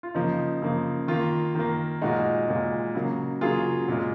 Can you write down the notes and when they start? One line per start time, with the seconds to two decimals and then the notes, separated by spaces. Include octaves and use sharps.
0.03 F4
0.15 C#3 F3 A#3 D#4
0.62 C#3 F3 A#3
1.08 D#3 A#3 F4
1.55 D#3 A#3
2.02 A#2 G#3 D#4 F#4
2.48 A#2 G#3
2.95 C#3 F#3 A#3
3.41 C#3 F#3 A#3 F4 G#4
3.88 A#2 G#3